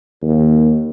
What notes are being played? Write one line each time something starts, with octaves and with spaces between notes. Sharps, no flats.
D#2